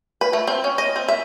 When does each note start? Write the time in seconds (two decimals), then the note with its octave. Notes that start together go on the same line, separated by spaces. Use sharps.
0.21 B4
0.33 A3
0.47 C4
0.64 C#4
0.78 D#5
0.96 C4
1.08 E5